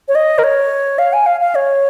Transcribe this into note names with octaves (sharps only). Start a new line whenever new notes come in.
C#5
D#5
A#4
C#5
F5
G#5
F5
F5
C#5